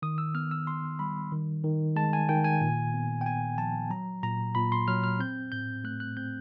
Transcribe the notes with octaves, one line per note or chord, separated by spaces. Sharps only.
D#3 D#6
E6
B3 F6
E6
B3 C6
G3 B5
D#3
D#3
G#3 A5
G#5
D#3 G5
G#5
A#2
B3
G5
B3 G#5
F3 A5
F#3 A#5
A#2 A#5
A#2 B5
C6
F#3 F6
F6
C4 G6
A2 G6
A3 F#6
F#6
C4 G6